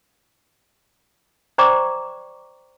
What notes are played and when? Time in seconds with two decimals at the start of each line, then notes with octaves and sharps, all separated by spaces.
1.58 C5 D5 G5 A#5 C#6 D6